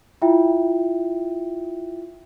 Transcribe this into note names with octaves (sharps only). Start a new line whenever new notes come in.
E4 F4 E5 G5